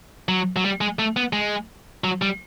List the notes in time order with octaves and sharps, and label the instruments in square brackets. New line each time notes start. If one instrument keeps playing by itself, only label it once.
[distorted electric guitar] F#3
F#3
G3
G#3
A3
B3
G#3
F#3
G3